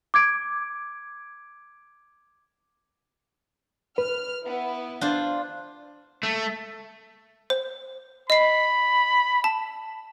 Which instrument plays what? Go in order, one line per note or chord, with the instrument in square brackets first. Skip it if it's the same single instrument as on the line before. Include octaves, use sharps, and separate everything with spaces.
[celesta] D6 G#6 D7
[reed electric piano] B4 [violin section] F6
[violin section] B3 E4
[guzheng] D4 F4 C5
[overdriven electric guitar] A3
[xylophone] C5
[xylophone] D#5 C7 [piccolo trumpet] B5
[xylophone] A5